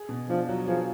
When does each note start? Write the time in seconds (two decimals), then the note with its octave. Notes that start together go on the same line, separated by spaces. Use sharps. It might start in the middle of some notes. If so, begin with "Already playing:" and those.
Already playing: G#4
0.09 B2
0.29 F3 D4
0.49 F#3
0.67 F3 G#4